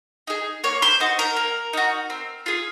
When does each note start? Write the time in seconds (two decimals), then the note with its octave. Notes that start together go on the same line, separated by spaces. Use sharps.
0.27 D#4 G#4
0.64 A#3 C#5
0.82 C5
1.00 D#4 F#4 C5
1.19 A#4
1.36 A#3
1.73 D#4 F#4
2.10 C4
2.46 F4 G#4